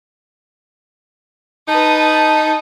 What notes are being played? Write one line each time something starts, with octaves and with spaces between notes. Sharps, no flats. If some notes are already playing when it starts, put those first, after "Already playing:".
D#4 B4 A5 D#6